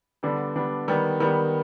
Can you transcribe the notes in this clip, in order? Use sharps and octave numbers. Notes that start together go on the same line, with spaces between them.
D3 G3 B3 D4
D3 G3 B3 D4
D#3 G3 B3
D#3 G3 B3